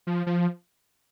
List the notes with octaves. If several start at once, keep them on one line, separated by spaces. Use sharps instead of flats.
F3
F3